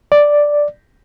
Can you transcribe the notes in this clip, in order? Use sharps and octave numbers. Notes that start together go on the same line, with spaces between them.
D5